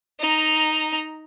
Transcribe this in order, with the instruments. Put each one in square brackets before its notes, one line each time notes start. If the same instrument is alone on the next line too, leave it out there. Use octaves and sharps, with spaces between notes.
[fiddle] D#4 A#5